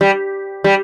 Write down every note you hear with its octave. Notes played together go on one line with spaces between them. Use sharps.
G3
G3